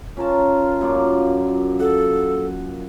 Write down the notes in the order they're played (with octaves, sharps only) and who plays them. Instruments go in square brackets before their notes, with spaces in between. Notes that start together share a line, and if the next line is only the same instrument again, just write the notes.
[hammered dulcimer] C#4 A#4 A5 [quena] F4
[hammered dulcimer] F#2 A#2 D5
[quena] A4 [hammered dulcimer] F#5